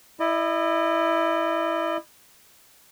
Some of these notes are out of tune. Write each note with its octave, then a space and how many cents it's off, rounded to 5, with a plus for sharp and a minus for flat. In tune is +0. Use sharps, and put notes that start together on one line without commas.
E4 +0 D#5 -40